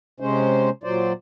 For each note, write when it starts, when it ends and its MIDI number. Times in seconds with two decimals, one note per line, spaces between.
0.20 0.70 48
0.20 0.70 56
0.20 0.70 61
0.20 0.70 72
0.84 1.13 46
0.84 1.13 54
0.84 1.13 72
0.84 1.13 74